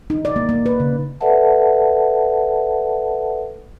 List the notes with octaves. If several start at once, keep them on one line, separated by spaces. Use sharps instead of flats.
D#4
D5
A#3
A#3
B4
C#3
A4 B4 D5 E5 F#5 A5